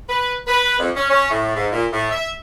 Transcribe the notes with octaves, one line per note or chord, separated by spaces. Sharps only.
B4
B4
F2
C#4
C#4
A2
G#2
A#2
A2
E5